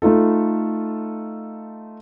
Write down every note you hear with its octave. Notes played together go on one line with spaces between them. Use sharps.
A3 D#4 F4 A4